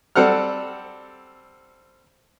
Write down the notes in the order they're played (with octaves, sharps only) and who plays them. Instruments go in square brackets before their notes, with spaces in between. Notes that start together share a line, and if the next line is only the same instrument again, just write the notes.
[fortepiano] G3 C4 A4 F#5 F6